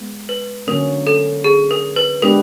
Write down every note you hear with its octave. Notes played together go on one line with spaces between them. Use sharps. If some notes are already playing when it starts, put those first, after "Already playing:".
Already playing: G#3 B3
B4
D3 F#3 A#3 C#4 A#4
A4
G#4
A#4
B4
G#3 B3 D4 G4 A#4 B4